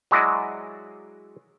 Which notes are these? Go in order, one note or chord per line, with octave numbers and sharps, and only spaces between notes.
F#3 G#3 E4 F#4 D5 D#5